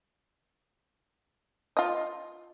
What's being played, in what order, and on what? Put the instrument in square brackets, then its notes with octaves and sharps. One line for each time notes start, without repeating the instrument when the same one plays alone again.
[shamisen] F4 D#5